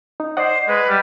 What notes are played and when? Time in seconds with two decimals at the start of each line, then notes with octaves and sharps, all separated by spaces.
0.20 D#4
0.37 C5 D5 D#5 F#5
0.68 G#3 B4
0.89 G3